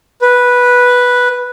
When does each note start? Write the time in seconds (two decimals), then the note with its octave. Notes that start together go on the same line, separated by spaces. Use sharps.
0.22 B4